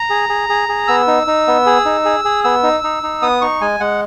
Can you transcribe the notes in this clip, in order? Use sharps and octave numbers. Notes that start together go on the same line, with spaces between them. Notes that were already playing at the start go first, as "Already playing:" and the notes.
Already playing: A#5
G#4
G#4
G#4
G#4
B3 E6
D#4
D#4
B3
G#4
D#4
G#4
G#4
B3 E6
D#4
D#4
D#4
B3 D#6
D#4 C#6
G#3 G#5
G#3 F#5